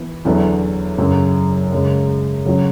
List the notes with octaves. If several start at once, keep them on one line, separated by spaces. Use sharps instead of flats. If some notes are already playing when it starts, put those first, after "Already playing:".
Already playing: E3 B3
E2 D3 F#3 B3 E4
F#2 C#3 F#3
F#2 C#3 G#3
C#3 F#3 C#4 F#4